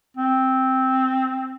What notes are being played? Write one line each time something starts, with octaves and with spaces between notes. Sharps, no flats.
C4